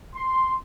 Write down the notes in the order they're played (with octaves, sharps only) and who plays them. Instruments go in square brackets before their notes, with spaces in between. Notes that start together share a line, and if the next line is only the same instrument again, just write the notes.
[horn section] C6